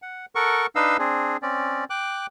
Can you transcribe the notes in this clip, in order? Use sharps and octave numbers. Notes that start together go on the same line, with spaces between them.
F#5
A4 A#4 F#5 C#6
D4 D#4 B4 D#5 F5 E6
C4 D4 G#4
C4 C#4 D5
G5 D6 F#6